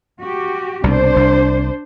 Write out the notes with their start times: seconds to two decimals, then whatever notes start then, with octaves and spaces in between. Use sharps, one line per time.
0.20 F#4 G4
0.84 C2 B2 D4 C5
1.16 C2